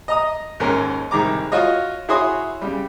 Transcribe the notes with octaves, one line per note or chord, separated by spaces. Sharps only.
D#5 A#5 D#6
D#2 G#2 C#4 A#4
C2 D#3 G#3 A#5 D6
F4 F#4 C#5 D#5
E4 F#4 G#4 C#5 C6 D#6
C#3 G3